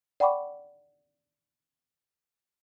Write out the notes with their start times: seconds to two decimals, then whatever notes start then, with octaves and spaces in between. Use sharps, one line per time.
0.20 D5 F#5 G5 B5 C#6 D6